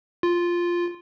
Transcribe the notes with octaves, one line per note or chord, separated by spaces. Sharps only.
F4